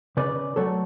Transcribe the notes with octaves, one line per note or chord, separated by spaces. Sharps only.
C#3 B4 D5
F#3 A3 A4 C#5